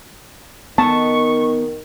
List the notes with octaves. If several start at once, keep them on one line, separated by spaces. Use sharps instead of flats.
D#3 B3 A5 C#6